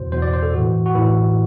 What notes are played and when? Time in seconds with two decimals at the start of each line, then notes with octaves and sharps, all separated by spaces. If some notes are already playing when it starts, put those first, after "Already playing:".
Already playing: E2 B2 C5
0.12 E2 B2 C5
0.22 D5
0.33 C5
0.43 A4
0.53 A2 E3 F#4
0.86 F#4
0.95 A2 E3 E4